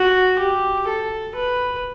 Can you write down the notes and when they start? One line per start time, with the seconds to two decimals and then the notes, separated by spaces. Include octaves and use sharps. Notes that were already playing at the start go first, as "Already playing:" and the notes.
Already playing: F#4
0.39 G4
0.88 A4
1.35 B4